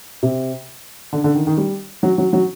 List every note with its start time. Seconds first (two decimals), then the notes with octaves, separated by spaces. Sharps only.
0.23 C3
1.13 D3
1.24 D3
1.35 D#3
1.47 D#3
1.57 G3
2.03 F#3
2.18 F#3
2.33 F#3